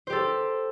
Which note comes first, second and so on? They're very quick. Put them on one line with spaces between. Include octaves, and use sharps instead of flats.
C5 G4 A4